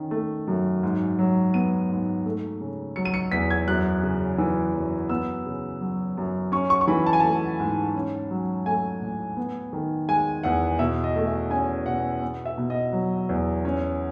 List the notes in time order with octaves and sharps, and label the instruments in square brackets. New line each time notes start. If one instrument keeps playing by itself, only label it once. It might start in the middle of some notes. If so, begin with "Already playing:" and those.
Already playing: [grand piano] D#3 C#4
A3
F#2
G#2
F#3
B3 D#7
G#2
A3
C#3
F#3 C#7
D#7
C#7
E2 B6
G#6
F#2 F#6
C#3
E3
F#2
B3 E6
C#3
F#3
F#2
C#4 C#6
C#6
C#6
E3 B5
A5
G#5
A3 A5
G#2
C#4
F#3
A3 G#5
A2
B3
D#3
G#3 G#5
E2 F#5
B2 E5
D#5
A3
E5
C#4 G#5
B2 F#5
B3
E5
B2
D#5
F#3
E2
C#4